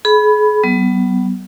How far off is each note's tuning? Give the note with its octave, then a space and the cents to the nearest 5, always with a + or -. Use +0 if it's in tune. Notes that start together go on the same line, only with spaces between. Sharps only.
G#4 +35 B5 +0
F#3 +45 B3 +0